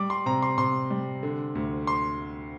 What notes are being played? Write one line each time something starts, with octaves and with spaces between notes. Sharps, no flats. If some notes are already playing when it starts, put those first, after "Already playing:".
Already playing: G3 D6
C6
C3 A#5
C6
C3 C6
G3
D3
D2
C6